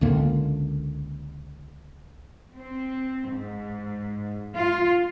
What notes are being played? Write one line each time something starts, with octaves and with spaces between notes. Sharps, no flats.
C#2 D3 A#3
C4
G#2
F4